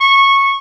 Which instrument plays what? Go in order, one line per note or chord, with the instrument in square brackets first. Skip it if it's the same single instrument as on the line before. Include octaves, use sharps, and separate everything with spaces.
[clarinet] C#6